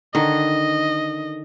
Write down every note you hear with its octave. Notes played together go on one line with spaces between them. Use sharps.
D3 D#3 D#5